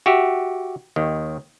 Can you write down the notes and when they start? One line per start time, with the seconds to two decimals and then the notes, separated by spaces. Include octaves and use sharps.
0.06 F#4 G4 E5
0.96 D#2 D#3